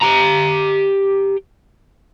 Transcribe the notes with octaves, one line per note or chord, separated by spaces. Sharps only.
G4 A#5